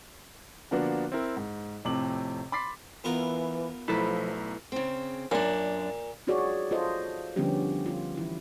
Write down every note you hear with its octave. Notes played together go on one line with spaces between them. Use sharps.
D3 F3 A#3 B3 D4 F#4
C4 E4 A#4
G#2
F2 A2 C3 D6 F#7
B5 C6 D6 A6 B6 C7
E3 B3 F4 A#4
B1 F3 A3 E4 A4 B4 A#5
C#3 C4
F#2 A#2 D4
D#4 F4 F#4 G#4 C#5 D5
F4 A4 C5 D#5
D3 F3 G3 B3 C#4 G4
F4
E3 E4